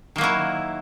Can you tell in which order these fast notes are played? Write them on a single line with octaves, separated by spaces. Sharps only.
D#3 A#3 F#3 E4